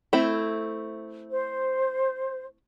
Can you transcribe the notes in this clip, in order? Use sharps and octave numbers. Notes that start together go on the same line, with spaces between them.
A3 C4 E4
C5